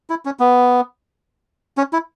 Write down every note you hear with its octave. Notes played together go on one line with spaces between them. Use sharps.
E4
C#4
B3
C#4
E4